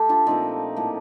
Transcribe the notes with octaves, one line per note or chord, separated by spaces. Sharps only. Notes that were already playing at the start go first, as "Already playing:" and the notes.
Already playing: A3 G4 A4
D4 F4
A#2 F3 A3 C4 D#4
A2 F3 A#3